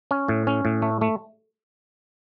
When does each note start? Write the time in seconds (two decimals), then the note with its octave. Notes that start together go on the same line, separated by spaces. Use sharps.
0.11 C#4
0.28 A2
0.47 C#4
0.65 A2
0.82 A3
1.01 A3